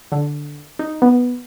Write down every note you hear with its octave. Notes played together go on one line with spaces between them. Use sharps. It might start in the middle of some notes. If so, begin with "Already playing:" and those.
D3
D#4
B3